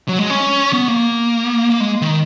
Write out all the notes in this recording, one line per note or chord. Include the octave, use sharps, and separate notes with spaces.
F#3
G#3
C#4
B3
A#3
A#3
G#3
D#3